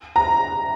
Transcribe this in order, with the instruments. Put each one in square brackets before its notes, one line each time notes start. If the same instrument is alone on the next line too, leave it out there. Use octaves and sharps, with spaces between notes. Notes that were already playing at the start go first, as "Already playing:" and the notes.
[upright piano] A#5